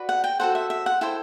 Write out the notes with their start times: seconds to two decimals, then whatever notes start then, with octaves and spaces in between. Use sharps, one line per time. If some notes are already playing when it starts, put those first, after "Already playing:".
Already playing: F#4 B4 D5
0.09 F#5
0.24 G5
0.39 F#4 A4 C5 F#5
0.55 E5
0.70 E5
0.86 F#5
1.01 E4 A4 C5 G5